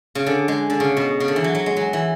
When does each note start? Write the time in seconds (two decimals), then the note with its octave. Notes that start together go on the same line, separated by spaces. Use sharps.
0.15 C#3
0.26 D3
0.48 G#3
0.70 D3
0.80 C#3
0.97 B2
1.20 C#3
1.28 D3
1.36 E3
1.44 F#3
1.55 F#3
1.66 G#3
1.76 F#3
1.93 E3